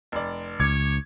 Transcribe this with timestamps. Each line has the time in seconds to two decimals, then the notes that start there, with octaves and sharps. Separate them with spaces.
0.12 F1 D5
0.60 C#2 C#5 D6 G#6